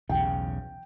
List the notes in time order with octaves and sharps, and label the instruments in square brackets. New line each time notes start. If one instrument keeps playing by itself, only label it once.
[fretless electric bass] B1 E2 C#3 [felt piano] G5